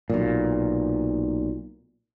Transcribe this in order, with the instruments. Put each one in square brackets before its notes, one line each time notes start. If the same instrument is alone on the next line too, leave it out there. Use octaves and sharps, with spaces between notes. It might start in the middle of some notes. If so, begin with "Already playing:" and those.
[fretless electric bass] B1 A#2